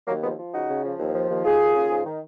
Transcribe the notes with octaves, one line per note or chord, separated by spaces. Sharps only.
D#2 F#3 A#3
F3 G#3 B3
F3
C#3 D#4 F#4
C#3
F3
D#2
F3
D#2
D#2 F4 G#4
D#2
C#3
G#2
D#3